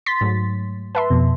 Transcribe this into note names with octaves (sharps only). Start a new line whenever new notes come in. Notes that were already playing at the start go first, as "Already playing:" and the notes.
C6 A6 B6
G#2 F#3 A3
B4 E5 A5 C6
F2 B2